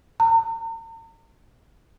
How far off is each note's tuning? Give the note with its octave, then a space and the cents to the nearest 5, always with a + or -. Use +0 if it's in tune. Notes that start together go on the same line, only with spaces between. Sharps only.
A#5 -45